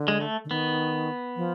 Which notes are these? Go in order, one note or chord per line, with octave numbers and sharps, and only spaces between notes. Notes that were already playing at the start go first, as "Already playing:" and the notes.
Already playing: D3
G#3
A3
D3
D#3 B3
F3